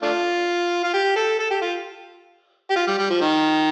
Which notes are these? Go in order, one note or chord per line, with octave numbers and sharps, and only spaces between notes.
A3 D4 F4
F4
G4
A4
A4
G4
F4
G4
F4
G3
G3
F3
D#3